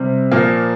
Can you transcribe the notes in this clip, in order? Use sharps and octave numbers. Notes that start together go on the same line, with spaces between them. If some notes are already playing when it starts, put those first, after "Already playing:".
Already playing: C3 G3 C4
A#2 F3 A#3